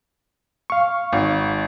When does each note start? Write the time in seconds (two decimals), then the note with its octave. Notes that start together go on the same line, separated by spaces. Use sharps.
0.70 F5 C#6
1.12 G#1